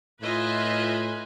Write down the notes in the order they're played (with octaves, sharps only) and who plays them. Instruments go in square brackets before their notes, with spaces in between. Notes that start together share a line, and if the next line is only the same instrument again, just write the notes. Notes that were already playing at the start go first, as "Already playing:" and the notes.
[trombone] A2 [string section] F4 D#5 E5 [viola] B4 G#5